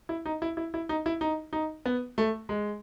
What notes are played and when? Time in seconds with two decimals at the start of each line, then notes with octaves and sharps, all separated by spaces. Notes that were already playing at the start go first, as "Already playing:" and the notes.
0.09 E4
0.26 D#4
0.42 E4
0.57 E4
0.74 E4
0.89 D#4
1.06 E4
1.21 D#4
1.53 D#4
1.86 B3
2.18 A3
2.49 G#3